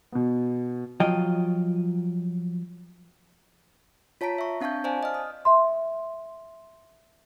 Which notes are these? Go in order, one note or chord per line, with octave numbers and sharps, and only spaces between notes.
B2 B3
F3 F#3 F4 D#5 G5
F4 C#5 A5 A#5 B6 D7
E5 C#6
C4 D4 F5 A5 C#6 G6
C5 D5 F5 G#5 A5
D#5 F6
D#6
E5 C6